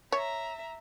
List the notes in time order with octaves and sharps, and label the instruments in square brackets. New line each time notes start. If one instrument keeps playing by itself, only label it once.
[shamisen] C#5 [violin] E5 A#5